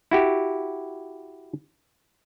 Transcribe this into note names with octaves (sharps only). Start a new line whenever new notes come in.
E4 F#4 G4